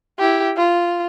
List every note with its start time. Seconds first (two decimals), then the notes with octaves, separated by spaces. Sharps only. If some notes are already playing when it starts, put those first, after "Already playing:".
0.19 E4 G4
0.57 F4